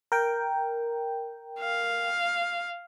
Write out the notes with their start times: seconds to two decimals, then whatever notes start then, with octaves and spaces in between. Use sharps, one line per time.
0.12 A#4 G5
1.60 F5